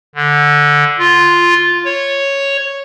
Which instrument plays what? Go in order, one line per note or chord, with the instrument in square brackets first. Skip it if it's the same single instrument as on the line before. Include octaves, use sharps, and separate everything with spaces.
[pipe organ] D3
F4
C#5